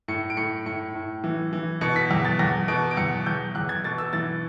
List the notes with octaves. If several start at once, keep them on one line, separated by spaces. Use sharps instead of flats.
A2 C#7
D7
A2 C#7
A2 C#7
A2
E3
E3
B2 C#7
B6
E2
A6
E2 A#6
B2 D7
D7
E2 C#7
E2 G6
E2 F#6
G#6
B2 A6
E6
E3 A6